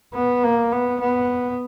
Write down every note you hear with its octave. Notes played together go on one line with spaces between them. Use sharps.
B3
A#3
B3
B3